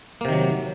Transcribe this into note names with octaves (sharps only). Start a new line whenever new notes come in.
C3 D#3 F#3 A#3